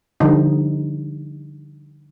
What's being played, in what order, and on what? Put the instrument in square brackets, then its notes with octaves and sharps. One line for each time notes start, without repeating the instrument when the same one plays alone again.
[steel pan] D3 F3 G3 D#4